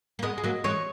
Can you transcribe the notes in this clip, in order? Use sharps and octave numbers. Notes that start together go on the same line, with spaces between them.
A#3
G#3 B3 D#5
G#3
F#3 A#3
E3 G#3 C#5